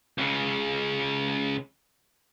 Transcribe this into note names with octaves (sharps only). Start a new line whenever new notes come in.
C#2 C#3